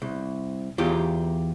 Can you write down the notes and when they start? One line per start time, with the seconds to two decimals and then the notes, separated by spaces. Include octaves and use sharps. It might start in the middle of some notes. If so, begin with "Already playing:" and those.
0.02 C2
0.78 E2 F4 G4